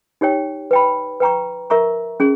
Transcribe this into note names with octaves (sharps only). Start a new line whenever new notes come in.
D#4 G4 C#5 G5
B4 G5 B5
B4 G5 A#5 C#6
A#4 E5 A#5 C#6
C#4 G#4